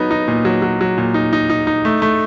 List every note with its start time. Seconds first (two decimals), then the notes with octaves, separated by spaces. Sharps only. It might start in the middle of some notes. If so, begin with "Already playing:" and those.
Already playing: F#3 B3 D#4
0.11 D#4
0.28 A#2
0.45 F#3
0.62 F#3
0.81 F#3
0.98 A#2
1.14 D#4
1.33 D#4
1.50 D#4
1.67 D#4
1.85 A3
2.02 A3